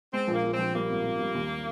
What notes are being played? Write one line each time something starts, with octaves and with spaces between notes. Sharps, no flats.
G#3 C4
A#1
A#3
F3
C4
A#1
G3 A#3
G#1
G#1
G3
D#2